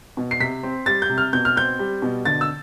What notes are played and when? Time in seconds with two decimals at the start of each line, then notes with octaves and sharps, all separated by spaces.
0.17 B2
0.31 C7
0.40 C3 B6
0.63 C4
0.86 G3 A6
1.02 G6
1.09 C3
1.18 F6
1.33 B2 G6
1.45 F6
1.56 C4 G6
1.79 G3
2.02 B2
2.25 D3 A6
2.41 E6